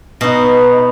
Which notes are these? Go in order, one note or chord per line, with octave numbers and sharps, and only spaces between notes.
B2 D#4